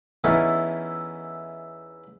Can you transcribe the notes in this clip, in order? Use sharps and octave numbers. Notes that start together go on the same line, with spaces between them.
E2 E3 C#4 D#4 E4 A4